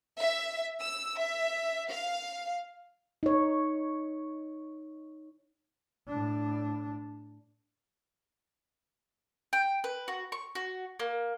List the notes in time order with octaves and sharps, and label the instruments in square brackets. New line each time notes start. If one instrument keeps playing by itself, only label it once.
[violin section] E5
E6
E5
F5
[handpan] D#4 C#5
[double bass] A2 D4
[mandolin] G5
B4
F#4
C#6
F#4
A#3